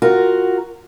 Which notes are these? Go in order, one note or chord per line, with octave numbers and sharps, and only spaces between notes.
F4 F#4 A#4